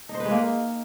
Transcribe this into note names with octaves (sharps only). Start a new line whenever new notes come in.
D#4
C5
B4
G#3
A#3